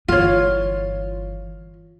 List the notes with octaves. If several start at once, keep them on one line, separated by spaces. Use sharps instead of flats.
G1 E3 F4 C#5